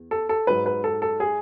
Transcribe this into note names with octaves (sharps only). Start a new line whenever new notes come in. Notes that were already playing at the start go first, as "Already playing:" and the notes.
Already playing: E2
A4
A4
G#2 F#3 B4
B4
A4
A4
G#4